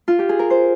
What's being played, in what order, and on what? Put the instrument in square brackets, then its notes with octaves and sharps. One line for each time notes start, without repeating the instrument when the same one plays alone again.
[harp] F4
G4
G#4
A#4
C5